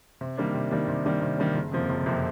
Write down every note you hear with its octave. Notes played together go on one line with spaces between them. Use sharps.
C3
D#3 G3 A#3 D4
C3
D#3 G3 A#3 D4
C3
D#3 G3 A#3 D4
C3
D#3 G3 A#3 D4
F#1
F2 C3 F3 A#3
F#1
F2 C3 F3 A#3